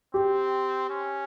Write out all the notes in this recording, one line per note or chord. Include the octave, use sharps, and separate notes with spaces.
C4 G4
C#4